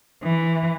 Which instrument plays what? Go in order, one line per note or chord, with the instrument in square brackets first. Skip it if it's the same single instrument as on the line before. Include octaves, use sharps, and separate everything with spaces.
[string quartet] E3